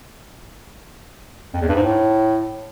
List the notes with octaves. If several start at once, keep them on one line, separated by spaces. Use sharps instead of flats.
F2
E2
G2
G#2
A2